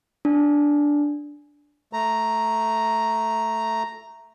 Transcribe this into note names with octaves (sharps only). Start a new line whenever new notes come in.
D4
A3 A#5